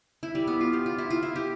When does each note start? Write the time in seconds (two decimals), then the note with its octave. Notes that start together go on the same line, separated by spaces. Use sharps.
0.23 E4
0.35 G3
0.47 B3
0.61 F4
0.73 G4
0.86 F4
0.98 E4
1.10 F4
1.23 E4
1.36 G4